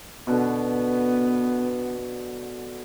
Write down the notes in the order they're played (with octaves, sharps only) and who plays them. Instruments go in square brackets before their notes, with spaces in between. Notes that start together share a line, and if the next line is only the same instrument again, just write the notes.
[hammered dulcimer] B2 D3 [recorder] B3